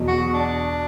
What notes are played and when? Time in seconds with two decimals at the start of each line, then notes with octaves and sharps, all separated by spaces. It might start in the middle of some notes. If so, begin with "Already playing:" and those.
Already playing: E2 B2 F#3
0.08 F#4
0.34 D4